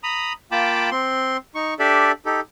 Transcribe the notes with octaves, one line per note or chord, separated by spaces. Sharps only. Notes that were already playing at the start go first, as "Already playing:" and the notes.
A#5 B5 D#6
A#3 F4 G5 A5 B5 D6
C4 C6
D#4 C#6
D4 G4 A4 D5 E5
D#4 G4 A4